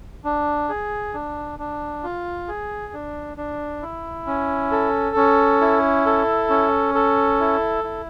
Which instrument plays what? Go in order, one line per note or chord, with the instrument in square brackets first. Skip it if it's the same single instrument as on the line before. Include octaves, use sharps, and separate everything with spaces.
[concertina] D4
G#4
D4
D4
F4
G#4
D4
D4
E4
C#4
A4
C#4
E4
A4
C#4
A4
E4
E4